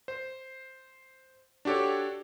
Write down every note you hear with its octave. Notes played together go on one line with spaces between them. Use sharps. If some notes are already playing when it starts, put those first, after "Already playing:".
C5
D4 F#4 G4 A4 C#5